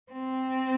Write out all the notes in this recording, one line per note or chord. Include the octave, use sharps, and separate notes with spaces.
C4